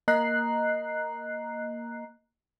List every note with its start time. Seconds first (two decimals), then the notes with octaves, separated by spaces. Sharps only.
0.08 A#3 D#5 A#5 F#6 C7